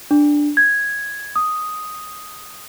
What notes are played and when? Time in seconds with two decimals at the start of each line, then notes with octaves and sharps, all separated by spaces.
0.11 D4
0.57 G#6
1.36 D#6